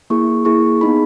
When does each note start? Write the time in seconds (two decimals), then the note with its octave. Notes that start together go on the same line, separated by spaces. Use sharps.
0.10 A#3 E4 G#4 C#6
0.45 A#3 E4 G#4 C#6
0.81 B3 D#4 G#4 B5